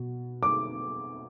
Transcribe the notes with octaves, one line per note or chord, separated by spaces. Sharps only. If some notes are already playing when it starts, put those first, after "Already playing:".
Already playing: B2
D6